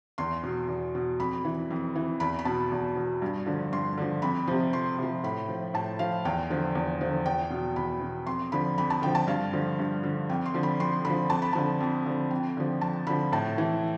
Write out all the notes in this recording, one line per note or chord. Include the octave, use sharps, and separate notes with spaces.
E2 C6
B2
E2
B2
F2 B5
E3
F2
E3
E2 B5
B5
B2 A5
E2
B2
G2
D3 F3
G2 C6
D3 F3
F2 B5
C3 F3
F2 C6
C3 F3
A2 B5
F3
A2 A5
F3 F5
E2 G5
D3 F3
E2
D3 F3
E2 G5
B2
E2 B5
B2
F2 C6
D3 F3 B5
F2 B5
A5
D3 F3 G5
A5
G2 F5
D3 F3
G2
D3 F3
F2 G5
C6
D3 F3
B5
F2 C6
D3 B5
F3
F2 A5
B5
D3 F3 A5
F2
D3 F3
F2 G5
D3 F3
F2 A5
D3 F3 B5
A2 A5
E3